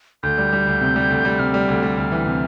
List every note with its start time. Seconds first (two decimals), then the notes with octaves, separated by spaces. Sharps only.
0.23 D2 G6
0.38 G3
0.53 G3
0.67 D2
0.81 C3
0.96 G3
1.10 D2
1.25 G3
1.39 C3 F6
1.54 G3
1.69 D2
1.83 G3
1.97 D2 F6
2.12 E3
2.26 C3